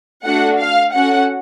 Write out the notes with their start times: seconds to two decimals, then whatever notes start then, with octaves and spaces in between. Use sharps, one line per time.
0.24 A3 D4 F#4 A4 F#5
0.58 F5
0.93 C#4 F#4 A4 F#5